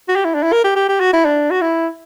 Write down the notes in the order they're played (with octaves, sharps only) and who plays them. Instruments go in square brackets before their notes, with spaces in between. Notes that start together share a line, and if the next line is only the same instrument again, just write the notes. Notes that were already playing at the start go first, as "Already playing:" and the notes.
[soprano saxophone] F#4
G4
E4
D4
E4
A#4
G4
G4
G4
F#4
E4
D4
F#4
E4